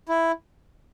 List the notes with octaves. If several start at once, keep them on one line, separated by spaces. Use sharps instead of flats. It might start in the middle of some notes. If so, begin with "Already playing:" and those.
E4